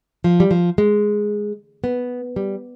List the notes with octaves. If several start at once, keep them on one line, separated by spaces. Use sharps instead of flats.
F3
G3
F3
G#3
B3
G3